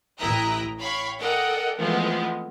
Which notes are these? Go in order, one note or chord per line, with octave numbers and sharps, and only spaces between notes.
A1 E4 G5 A#5 D#6 F#6
C#5 F5 G5 B5 C#6
A4 A#4 D5 D#5 F#5 G5
E3 F3 G#3 A3 B3 C4